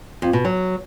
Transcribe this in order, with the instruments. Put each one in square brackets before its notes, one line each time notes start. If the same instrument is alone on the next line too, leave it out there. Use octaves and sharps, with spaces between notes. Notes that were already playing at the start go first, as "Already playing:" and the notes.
[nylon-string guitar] F2
B2
F#3